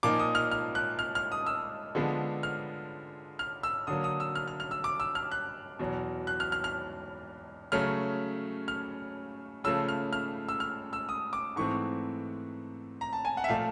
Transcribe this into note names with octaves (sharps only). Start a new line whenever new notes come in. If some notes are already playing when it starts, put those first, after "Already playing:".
A#2 F3 A#3 D#4 D6
D#6
F6
F6
F#6
F6
F6
D#6
E6
D3 F3 G#3 B3
F6
F6
E6
D3 F#3 A#3 D#6
D#6
E6
F6
F6
F6
E6
D6
E6
F6
F#6
E2 B2 F#3
F#6
F6
F6
F6
C#3 F#3 A3 C#4 F6
F6
C#3 F3 A3 E6
F6
F6
E6
F6
E6
D#6
D6
G#2 E3 A3 C4 C#6
A#5
A5
G#5
F#5
E5
A#2 F3 A3 F5